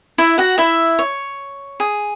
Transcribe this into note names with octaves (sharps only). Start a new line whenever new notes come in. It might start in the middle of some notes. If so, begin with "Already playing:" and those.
E4 E5
F#4 F#5
E4 E5
C#5
G#4